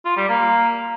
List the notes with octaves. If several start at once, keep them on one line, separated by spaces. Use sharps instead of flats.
F4
G3
A#3